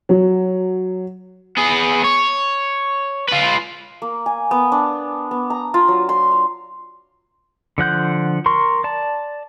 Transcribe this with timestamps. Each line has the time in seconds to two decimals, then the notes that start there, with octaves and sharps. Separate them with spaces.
0.09 F#3
1.57 B3 G#4
2.04 C#5
3.29 F4 B4
4.02 A#3
4.26 G#5
4.51 B3
4.72 D4
5.31 B3
5.50 A#5
5.74 F4
5.88 F#3
6.09 C6
6.31 F5
7.78 D3 F3 F#5 G6
8.46 A#4 C6 C#6
8.84 D5 A5